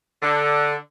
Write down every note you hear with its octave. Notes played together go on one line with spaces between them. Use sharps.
D3